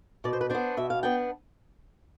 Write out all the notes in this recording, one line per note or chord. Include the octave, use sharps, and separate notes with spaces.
B2 D5
C5
B4
B3 D4 C5
B2 E5
F5
B3 D4 G5